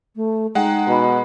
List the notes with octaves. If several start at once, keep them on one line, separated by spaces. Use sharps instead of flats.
A3
G#3 D#4 F#5 G5
B2 F#4 B5